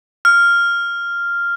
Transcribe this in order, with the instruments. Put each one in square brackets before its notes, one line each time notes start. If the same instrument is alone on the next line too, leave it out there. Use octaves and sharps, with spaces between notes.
[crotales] F6